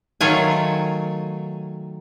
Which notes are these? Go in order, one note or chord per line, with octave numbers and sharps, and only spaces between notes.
D#3 F#3 A3 F4 G#5